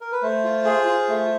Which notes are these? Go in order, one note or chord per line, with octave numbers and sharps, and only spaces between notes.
A#4
B4
A3 C5
F4
G#4
F4
A3